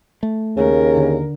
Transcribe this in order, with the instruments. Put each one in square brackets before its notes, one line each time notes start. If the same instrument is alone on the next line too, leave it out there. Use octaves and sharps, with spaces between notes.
[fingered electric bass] A3
[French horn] D#2 [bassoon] C#3 [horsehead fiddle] A#4
[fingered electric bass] D3